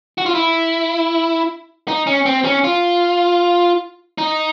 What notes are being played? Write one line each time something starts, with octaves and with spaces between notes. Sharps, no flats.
F#4
F4
E4
D#4
C#4
C4
C#4
F4
D#4